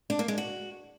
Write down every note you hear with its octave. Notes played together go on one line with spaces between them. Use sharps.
D4
A#3
G#3
F#4